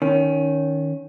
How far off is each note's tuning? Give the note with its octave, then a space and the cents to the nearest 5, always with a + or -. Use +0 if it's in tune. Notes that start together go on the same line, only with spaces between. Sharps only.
D#3 +0 C#4 +10